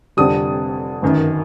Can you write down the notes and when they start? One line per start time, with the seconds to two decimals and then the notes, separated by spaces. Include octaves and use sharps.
0.17 F1 F2 D3 G3 D#6
1.02 G1 F#2 D#3